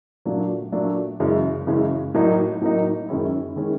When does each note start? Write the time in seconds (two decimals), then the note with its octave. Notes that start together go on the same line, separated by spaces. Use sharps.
0.25 A#2 F#3 A3 D4
0.72 A#2 F#3 A3 D4
1.20 F#2 C#3 E3 G#3 C#4
1.67 F#2 C#3 E3 G#3 C#4
2.14 A2 F#3 A#3 D#4
2.61 A2 F#3 A#3 D#4
3.09 F#2 D#3 G#3 C#4 E4
3.56 D#3 G#3 C#4 E4